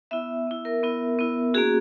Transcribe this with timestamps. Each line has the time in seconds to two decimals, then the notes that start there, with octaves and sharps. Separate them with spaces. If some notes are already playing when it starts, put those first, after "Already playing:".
0.11 B3 E4 E5
0.47 B3 E4
0.65 A#4
0.83 B3 E4
1.19 B3 E4
1.54 A#3 C#4 F#4 G#4